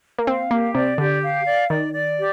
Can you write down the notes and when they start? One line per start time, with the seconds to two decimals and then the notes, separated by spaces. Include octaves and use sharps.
0.18 A#3
0.27 C4 F5
0.51 A#3 G4
0.75 C3 D5
0.98 D3 G4
1.22 F5
1.46 D5
1.70 D#3 D5
1.94 D5
2.17 G4